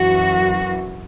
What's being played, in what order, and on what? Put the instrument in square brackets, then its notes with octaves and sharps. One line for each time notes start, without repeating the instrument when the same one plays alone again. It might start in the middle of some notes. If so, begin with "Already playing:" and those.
Already playing: [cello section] F#2 E3 F#4